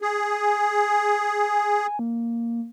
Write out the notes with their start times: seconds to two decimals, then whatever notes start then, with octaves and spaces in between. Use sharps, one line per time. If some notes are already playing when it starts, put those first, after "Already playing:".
0.02 G#4
0.31 G#5
1.99 A#3